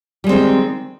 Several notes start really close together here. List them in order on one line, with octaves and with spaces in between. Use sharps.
G3 G#3 C4 D#3